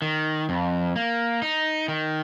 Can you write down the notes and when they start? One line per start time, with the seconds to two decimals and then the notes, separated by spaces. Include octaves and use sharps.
0.02 D#3
0.49 F2
0.96 A#3
1.42 D#4
1.88 D#3